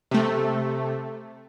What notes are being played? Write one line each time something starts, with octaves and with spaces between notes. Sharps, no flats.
C3 A3